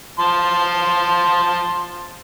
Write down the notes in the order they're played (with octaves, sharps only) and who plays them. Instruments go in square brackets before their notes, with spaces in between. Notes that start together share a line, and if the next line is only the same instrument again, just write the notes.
[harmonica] F3 A5 C6